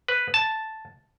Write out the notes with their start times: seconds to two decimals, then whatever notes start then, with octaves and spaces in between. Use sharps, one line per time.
0.08 B4
0.34 A5